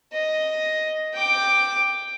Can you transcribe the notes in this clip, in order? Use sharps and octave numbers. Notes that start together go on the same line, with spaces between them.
D#5
G5 D6